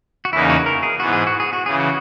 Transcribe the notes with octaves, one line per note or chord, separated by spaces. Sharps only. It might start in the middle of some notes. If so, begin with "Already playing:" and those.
F#4
E2 C#3 E3 A#3 D#4 E4
F#4
A#4
G#4
G#2 E3 B3 F#4
G#4
F#4
G#4
F#4
C#3 E3 G#4
F#4